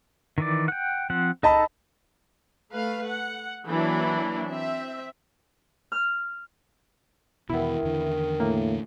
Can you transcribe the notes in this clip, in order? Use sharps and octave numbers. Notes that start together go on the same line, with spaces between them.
D#3 E3 D5
F#5 G5
F3 C4 F#5
D#4 A4 D#5 A5 B5
A3 B4 F5
F#5
E3 F#3 A#3 D4 E4
C4 E5
F6
E2 B2 D#3 B3 E4
E2 D3
A2 A#3